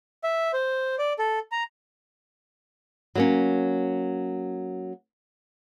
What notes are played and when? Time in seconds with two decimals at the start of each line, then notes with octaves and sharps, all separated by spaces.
0.24 E5
0.53 C5
0.99 D5
1.19 A4
1.52 A#5
3.15 F#3 A#3 C#4